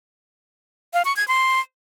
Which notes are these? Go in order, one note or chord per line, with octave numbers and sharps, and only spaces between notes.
F5
C#6
G#6
C6